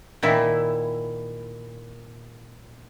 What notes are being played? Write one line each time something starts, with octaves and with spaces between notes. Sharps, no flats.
A#2 D#3 E4